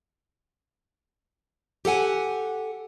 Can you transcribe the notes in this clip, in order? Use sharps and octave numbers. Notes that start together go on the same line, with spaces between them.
G4 A4 F#5 G#5